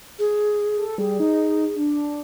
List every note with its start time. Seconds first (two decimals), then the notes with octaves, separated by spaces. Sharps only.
0.19 G#4
0.77 A4
0.98 G3 G#4
1.20 D#4
1.76 D4